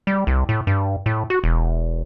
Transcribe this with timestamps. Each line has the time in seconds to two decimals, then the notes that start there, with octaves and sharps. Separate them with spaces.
0.07 G3
0.27 C2
0.49 A2
0.67 G2
1.06 A2
1.30 F#4
1.44 E1